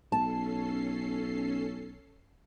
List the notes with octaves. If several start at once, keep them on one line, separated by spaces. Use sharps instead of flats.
B1 C#4 A4 A5 C7